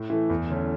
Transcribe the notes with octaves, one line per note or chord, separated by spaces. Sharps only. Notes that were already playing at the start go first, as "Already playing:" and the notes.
Already playing: A2
E3 A3
E2
D3 A3 C#4